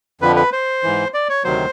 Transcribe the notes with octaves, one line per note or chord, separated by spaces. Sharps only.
F2 D3 F3 B4
B4
C5
G#2 E3
D5
C#5
D2 C3 D#3 F#3 C5